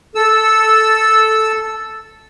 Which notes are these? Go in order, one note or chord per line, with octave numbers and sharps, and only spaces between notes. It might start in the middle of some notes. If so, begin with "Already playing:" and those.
A4 E6